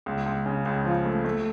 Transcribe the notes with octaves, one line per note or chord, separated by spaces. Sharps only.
C#2
C#2
C#3
C#2
F3
A3
A3